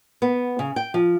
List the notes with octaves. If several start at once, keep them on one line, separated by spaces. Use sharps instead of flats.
B3
C#3
G5
F3